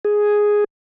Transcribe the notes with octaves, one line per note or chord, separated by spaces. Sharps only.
G#4